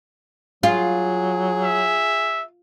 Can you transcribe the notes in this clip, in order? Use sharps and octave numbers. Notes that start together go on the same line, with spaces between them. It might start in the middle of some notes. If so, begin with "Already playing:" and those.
F#3 F4 G#4
E5